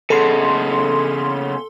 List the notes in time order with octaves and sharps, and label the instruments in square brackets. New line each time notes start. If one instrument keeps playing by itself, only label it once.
[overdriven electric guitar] C#3 B3 [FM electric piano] A4 C6